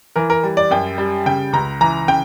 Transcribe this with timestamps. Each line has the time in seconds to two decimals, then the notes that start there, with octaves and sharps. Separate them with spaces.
0.16 E3 A#4
0.30 A#4
0.43 G3
0.57 D5
0.71 F#2 G5
0.98 G3
1.26 C#3 G5
1.53 C#2 A#5
1.81 E3 A#5
2.08 C#3 G5